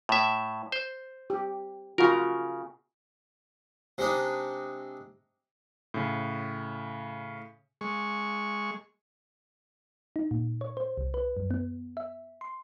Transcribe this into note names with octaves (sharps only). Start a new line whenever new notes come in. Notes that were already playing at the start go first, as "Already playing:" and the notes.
A2 E5
C5
G4
C#3 F4 F#4 A#4 A#5
C3 G#3 D4 D#4
A2 C#3
G#3 C#6
D#4
A#2
C#5
C5
C2
B4
F#2
B3
E5
C6